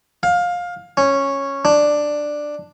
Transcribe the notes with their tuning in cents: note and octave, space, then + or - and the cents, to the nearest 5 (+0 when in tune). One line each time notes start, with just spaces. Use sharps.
F5 +20
C#4 -10
D4 +5